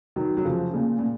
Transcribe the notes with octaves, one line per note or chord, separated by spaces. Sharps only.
D#3 F#3
F#3
C#3 F3
A#2 C#3
A#2